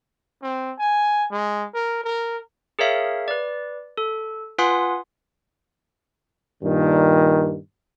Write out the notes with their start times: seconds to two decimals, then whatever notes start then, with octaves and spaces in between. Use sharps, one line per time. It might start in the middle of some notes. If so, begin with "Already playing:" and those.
0.42 C4
0.79 G#5
1.31 G#3
1.74 A#4
2.04 A#4
2.79 G#4 A#4 C#5 E5 F5
3.28 B4 D5
3.97 A4
4.58 F4 B4 F#5 G#5 C6 D#6
6.63 G2 A#2 D#3